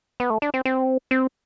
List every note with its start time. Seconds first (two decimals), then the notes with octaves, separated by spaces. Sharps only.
0.20 B3
0.30 A3
0.42 D4
0.54 C4
0.65 C4
1.11 C4